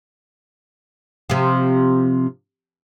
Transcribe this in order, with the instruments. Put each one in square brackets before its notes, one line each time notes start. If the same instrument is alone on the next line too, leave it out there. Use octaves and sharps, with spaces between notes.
[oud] C3 F3